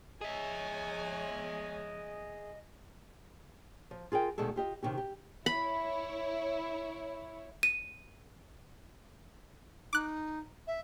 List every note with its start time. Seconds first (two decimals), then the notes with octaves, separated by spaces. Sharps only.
0.22 G#3 G#4 C#5 D#5 E5 G#5
3.91 F3
4.12 F4 G#4 A#4 G5
4.38 D2 B2 D#3 G#3 A4
4.56 F4 G4 D#5
4.82 C3 D#3 C#4 G4
4.97 G4
5.46 E4 C#5 B5
7.63 D#7
9.93 D#4 D6 F#6
10.67 E5